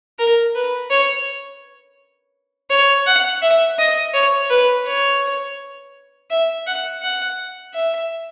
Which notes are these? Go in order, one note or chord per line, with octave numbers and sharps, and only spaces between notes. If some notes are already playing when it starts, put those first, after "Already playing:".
A#4
B4
C#5
C#5
F#5
E5
D#5
C#5
B4
C#5
E5
F#5
F#5
E5